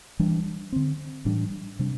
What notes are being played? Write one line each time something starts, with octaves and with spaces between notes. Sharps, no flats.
E3 G3 D4
D3 C4
A2 E3 G3 D4
C3 G3 D4